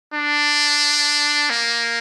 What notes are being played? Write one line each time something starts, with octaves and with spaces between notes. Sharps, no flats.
D4
A#3